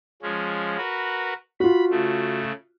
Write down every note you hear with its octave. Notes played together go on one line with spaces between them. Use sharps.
F3 G#3 C#4
F#4 A#4 B4
F4 F#4 B5
C#3 A3